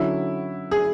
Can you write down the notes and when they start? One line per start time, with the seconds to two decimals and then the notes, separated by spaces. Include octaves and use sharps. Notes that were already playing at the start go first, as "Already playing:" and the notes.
Already playing: D3 F#3 C#4 E4 F#4
0.71 G#4